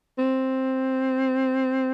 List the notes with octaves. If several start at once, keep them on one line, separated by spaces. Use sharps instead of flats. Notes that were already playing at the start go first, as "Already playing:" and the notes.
C4